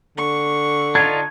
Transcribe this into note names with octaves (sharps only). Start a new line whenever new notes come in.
D3 C#6
D4 D#4 F4 G#6